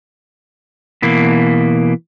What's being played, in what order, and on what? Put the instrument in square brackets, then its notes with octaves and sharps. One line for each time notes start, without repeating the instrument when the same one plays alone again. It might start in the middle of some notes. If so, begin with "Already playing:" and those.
[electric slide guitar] B2 E3 A#3